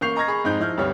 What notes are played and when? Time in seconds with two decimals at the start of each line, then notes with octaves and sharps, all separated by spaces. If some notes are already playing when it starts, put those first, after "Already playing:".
0.01 A1 A#3 C#6 G6 C7 F7
0.16 D#5 A#5 C#6 F6 G#6 A#6
0.28 G#4 B5 C#6
0.44 F2 G#2 D#4 C5 G6
0.60 F3 E4 F6 G6
0.77 D2 G2 C3 G3 C#5 F6